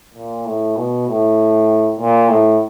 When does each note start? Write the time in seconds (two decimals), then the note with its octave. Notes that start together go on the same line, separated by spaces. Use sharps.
0.14 A#2
0.46 A2
0.76 B2
1.07 A2
1.99 A#2
2.29 A2